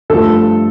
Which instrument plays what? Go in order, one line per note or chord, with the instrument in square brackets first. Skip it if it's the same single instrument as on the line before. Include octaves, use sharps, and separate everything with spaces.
[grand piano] G2 F3 A3 A4